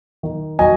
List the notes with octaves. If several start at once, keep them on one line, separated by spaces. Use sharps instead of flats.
D#3
F#3 D#5 G#5